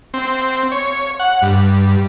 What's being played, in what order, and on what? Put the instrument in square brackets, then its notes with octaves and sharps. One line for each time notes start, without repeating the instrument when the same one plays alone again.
[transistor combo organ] C4
C#5
F#5
G2